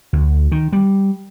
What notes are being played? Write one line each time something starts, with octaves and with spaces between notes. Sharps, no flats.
D2
D#3
G3